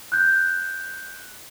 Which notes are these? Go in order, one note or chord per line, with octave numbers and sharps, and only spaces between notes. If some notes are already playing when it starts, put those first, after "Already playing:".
F#6 G6